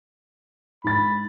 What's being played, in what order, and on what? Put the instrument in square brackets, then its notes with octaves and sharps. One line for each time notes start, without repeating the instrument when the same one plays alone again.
[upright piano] G#2 A6 [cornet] B5